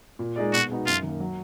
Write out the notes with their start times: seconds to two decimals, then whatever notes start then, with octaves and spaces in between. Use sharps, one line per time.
0.19 A#2
0.36 G#3 D#4 G#4 D5
0.53 B2 F#4
0.69 G#3 B3 D#4 F#4
0.86 F#2 F4
1.03 D#3 A#3
1.20 F#3